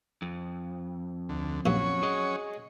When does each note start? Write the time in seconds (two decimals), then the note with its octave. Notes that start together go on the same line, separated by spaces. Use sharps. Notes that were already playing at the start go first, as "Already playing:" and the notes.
0.22 F2
1.29 D2
1.66 A#1 G2 F#3 C#4 C#5
2.03 G#4 D#5